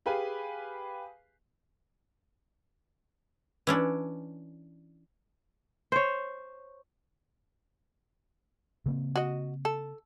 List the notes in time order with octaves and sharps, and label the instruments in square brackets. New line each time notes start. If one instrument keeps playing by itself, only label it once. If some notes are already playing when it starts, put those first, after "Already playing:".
[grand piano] G4 G#4 B4 F5 G#5
[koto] E3 C#4 D4
[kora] C5 C#5
[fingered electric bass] C#3 A#3 C4
[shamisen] F#4 D#5
A4